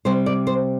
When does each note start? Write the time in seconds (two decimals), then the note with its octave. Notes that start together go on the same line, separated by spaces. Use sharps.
0.05 C3 G3 C5
0.26 D5
0.47 C5